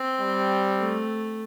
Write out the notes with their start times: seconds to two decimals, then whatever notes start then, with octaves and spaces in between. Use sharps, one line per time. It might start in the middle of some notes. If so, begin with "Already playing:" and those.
Already playing: C4
0.20 G3
0.79 A3